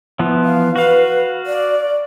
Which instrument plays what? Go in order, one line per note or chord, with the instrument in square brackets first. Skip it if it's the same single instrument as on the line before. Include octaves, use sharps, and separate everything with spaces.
[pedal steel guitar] E3 F3 B3
[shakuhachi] F5
[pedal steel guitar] F#4 F5 [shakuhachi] B4
[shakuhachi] D5